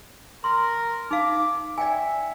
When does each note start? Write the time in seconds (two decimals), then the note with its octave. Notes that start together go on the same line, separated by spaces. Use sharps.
0.44 A#4 C6
1.11 D#4 F5 D6
1.78 D5 E5 G5 G#5